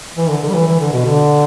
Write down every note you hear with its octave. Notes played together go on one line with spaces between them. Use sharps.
E3
D3
D3
G3
E3
E3
D3
B2
D3